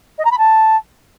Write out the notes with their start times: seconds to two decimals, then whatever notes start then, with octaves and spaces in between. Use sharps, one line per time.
0.18 D#5
0.25 A#5
0.31 B5
0.38 A5